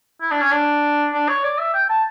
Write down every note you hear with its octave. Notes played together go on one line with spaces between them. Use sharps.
E4
D4
C#4
D4
D4
C#5
D5
E5
G5
A5